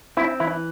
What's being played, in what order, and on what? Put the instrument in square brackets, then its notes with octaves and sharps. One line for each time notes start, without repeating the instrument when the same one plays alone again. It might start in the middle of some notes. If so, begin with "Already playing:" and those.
[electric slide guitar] C4 [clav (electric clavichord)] E4
[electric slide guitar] E3 [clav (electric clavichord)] E4